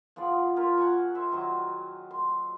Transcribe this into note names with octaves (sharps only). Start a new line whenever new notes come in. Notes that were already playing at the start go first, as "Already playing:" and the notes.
F3 B3 G#4 D5
A#2 F4 A#4 B5
F#5 G#5 C#6
C5 E5
D#3 F#3 C5 D#5
C6